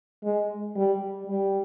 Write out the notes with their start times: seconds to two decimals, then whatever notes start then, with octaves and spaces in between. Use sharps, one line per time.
0.23 G#3
0.75 G3
1.27 G3